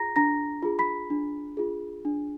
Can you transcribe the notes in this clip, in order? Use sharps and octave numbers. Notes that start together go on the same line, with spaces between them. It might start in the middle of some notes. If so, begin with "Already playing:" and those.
Already playing: F4 G#4 A#5 A#6
D4 A#5 A#6
F4 G#4
B5 B6
D4
F4 G#4
D4